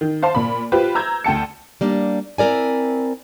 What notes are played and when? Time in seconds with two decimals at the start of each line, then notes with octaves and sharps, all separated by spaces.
0.01 D#3
0.22 C5 F5 A5 C6
0.35 A#2 B5
0.72 F4 G4 B4 C5
0.95 A#5 E6 G6 G#6
1.24 D2 G5 A5 C#7
1.81 G3 A#3 D4
2.38 C4 E4 A#4 D5 G#5